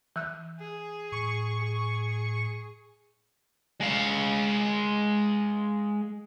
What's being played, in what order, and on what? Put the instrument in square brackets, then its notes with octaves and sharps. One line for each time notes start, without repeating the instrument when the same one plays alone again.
[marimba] E3 E6 F#6
[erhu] G#4
[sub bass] A2 [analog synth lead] C#6
[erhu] G#4
[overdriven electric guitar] G#3 F5